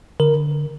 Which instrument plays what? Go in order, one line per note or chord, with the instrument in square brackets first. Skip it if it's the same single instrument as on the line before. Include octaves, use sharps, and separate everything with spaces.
[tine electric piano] D3 A#4